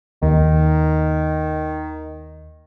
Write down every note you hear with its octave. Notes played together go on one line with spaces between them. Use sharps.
D#2 D#3